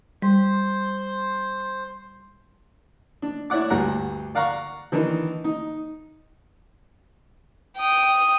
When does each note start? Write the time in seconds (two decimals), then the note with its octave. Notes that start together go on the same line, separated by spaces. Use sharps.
0.22 G3 C5
3.22 D4
3.50 E4 C#5 D5 F#5 D6
3.70 D2 G2 F#5 A#5
4.35 D5 F5 F#5 A#5 C#6
4.92 D#3 E3 D4 D#4
5.44 D#4
7.78 G5 D#6